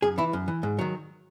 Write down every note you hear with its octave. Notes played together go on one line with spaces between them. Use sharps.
F#2 G#4
E3 E4
F#2
E3
G#2
D#3 F#3